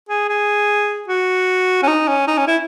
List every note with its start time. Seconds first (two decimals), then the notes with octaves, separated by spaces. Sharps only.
0.09 G#4
0.29 G#4
1.08 F#4
1.83 C#4
1.88 D#4
2.08 C#4
2.28 D#4
2.37 C#4
2.47 E4